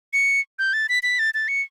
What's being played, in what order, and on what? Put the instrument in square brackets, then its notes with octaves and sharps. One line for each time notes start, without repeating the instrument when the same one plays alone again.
[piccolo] C#7
G6
A6
B6
B6
A6
A6
C#7